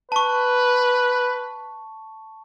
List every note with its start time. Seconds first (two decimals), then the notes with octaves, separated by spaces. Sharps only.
0.12 B4 A5 C#6